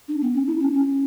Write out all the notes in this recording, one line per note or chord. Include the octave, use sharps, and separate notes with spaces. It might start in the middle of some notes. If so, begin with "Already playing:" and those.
D4
B3
C#4
E4
C#4
C#4